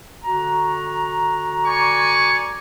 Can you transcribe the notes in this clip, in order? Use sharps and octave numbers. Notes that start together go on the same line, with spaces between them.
D3 F#4 A#5
D5 G#5 C#6